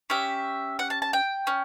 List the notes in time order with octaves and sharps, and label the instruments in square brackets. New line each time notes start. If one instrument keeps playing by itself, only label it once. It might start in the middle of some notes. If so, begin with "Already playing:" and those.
[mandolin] C#4 G4 E5
F#5
A5
A5
G5
C#4